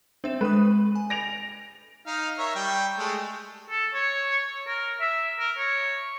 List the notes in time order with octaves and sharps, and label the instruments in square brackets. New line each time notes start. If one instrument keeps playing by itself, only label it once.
[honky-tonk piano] C4 [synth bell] D4 E5 E7
[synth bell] G#3 D#6 [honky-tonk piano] B4
[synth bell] G#5
[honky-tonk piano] A#6 D7 F7
[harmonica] D#4 F5
A#4 C#5 E5
G3 G5
G#3 A3
[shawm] A4
C#5
A#4
E5
A#4
C#5